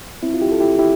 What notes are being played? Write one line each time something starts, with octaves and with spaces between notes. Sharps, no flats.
C4 E4
F4
E4 G4
A4
E4 G4
E4 G4